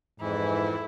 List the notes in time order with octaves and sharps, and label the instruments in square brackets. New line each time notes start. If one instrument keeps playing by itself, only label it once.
[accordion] F2 E3 [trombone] G#2 [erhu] E4